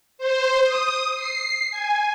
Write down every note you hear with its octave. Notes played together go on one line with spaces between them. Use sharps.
C5
D#6
C7
G#5